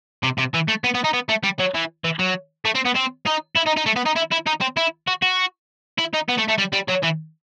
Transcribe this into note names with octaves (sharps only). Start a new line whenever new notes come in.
C3
C3
E3
A3
B3
B3
D#4
B3
A3
G3
F#3
E3
E3
F#3
A3
C4
B3
C4
D#4
E4
D#4
D#4
A3
B3
D#4
E4
E4
D#4
C4
E4
F#4
F#4
E4
D#4
B3
A3
A3
G3
G3
F#3
E3